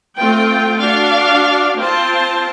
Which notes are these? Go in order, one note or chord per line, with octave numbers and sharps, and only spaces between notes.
A3 C4 F4 G5
D4 F#4 F5
C4 F4 C5 A5